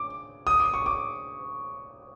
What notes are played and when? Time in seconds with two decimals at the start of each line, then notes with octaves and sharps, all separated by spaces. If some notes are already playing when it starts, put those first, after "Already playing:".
Already playing: D6
0.47 D#6
0.60 D6
0.74 C#6
0.86 D6